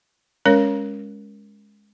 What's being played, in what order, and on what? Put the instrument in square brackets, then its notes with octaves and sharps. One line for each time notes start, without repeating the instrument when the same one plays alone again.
[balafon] G#3 C#4 A#4 C#5